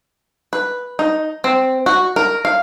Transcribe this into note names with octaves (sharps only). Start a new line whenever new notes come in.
B4
D#4
C4
F#4
A#4
F5